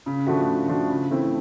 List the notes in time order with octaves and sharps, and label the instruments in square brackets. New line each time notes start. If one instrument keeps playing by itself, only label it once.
[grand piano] C#3
F3 A3 D4 F#4
C#3
F3 A3 D4 F#4
C#3
E3 A3 C4 E4